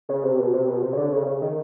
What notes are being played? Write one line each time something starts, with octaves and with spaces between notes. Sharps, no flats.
C#3
C3
B2
C3
B2
C3
C#3
D3
C#3
C#3
D#3